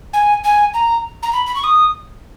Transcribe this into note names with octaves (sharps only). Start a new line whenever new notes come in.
G#5
G#5
A#5
A#5
B5
B5
C#6
D#6